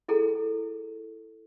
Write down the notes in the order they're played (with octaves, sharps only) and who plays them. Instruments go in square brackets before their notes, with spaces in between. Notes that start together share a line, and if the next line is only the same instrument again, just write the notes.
[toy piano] E4 G#4 A4 A#5